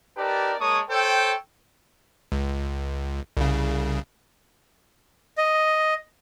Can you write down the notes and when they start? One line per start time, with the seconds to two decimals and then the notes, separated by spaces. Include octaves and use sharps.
0.18 D#4 G4 A#4 B4 D5 A5
0.59 G#3 A#3 C#5 A5 C#6 D#6
0.90 A4 C5 C#5 G5
2.32 C#2
3.37 C2 C#3
5.38 D#5